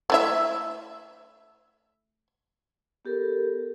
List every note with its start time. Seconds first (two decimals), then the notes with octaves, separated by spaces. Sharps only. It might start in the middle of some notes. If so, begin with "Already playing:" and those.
0.10 A3 E4 E5
3.05 B3 G4 A4 A#4